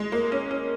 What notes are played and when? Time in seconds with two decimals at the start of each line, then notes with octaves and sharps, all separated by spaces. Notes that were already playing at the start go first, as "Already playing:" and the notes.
Already playing: G#3
0.12 A#3
0.32 C#4
0.51 C#4